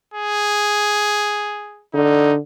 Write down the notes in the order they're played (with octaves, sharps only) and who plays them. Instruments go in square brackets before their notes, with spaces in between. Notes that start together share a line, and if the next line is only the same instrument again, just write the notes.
[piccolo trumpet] G#4
[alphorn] D3 [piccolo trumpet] D#4